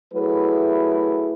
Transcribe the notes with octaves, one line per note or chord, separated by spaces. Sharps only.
F#3 A3 E4 G#4 B4